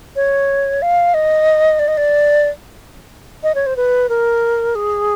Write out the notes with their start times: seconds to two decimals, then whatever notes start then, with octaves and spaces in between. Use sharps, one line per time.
0.16 C#5
0.82 F5
1.14 D#5
1.79 D5
1.88 D#5
1.97 D5
3.43 D#5
3.55 C#5
3.66 C5
3.76 B4
4.09 A#4
4.75 G#4